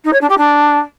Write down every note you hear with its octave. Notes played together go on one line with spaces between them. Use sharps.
D#4
C#5
D4
G4
D4